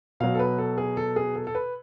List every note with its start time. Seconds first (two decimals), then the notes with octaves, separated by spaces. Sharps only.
0.20 B2 F#3 F5
0.35 A4
0.39 B4
0.58 A4
0.78 G#4
0.97 A4
1.16 G#4
1.36 A4
1.47 A4
1.55 B4